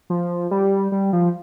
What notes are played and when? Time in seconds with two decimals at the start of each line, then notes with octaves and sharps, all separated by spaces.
0.10 F3
0.51 G3
0.92 G3
1.13 F3